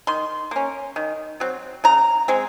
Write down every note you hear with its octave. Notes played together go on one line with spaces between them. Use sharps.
D#3 C6
A#3 C#4
D#3
F#3 C4
C#3 A#5
G#3 C4